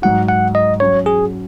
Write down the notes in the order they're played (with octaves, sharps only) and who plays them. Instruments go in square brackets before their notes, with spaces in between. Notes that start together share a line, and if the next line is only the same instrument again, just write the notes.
[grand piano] G#2 F#3 D#4 F#4 [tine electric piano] F#5
[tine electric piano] F#5
D#5
[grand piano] F#3 C#4 F#4 [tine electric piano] C#5
[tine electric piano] G#4